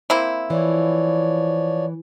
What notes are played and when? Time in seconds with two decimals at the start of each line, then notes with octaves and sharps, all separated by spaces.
0.10 A#3 C4 E4
0.50 E3 F3 C#5 D5